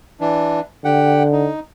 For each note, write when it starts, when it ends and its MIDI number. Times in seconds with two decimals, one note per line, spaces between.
0.20 0.60 52
0.20 0.60 62
0.85 1.49 50
0.85 1.23 67
0.85 1.23 78
0.85 1.23 79
1.32 1.60 63